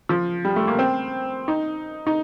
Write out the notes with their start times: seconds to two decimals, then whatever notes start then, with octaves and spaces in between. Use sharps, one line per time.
0.09 F3
0.45 G3
0.56 A3
0.68 A#3
0.79 C4
1.48 D#4
2.07 D#4